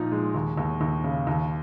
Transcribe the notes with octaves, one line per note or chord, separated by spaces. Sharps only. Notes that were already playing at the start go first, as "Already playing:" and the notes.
Already playing: A#2 F3 D#4
G#3
D#2
D#2
D#2
C#3
D#2